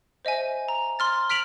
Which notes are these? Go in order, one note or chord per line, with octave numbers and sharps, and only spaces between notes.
C5 D#5 E5 G#5
A#5
C6 F6 A6
F6 B6 D7 F7 F#7